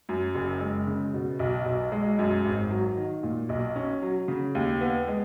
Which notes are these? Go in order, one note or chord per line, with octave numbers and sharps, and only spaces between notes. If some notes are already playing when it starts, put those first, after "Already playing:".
F#2
F#1
G#3
C#3
B2
B1
B1
G#3
F#2
G#1
F#3
D#3
A#2
B1
C#4
F#3
C#3
D#2
B3
G#3